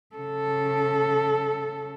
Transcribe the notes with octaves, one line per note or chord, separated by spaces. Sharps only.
C#3 A4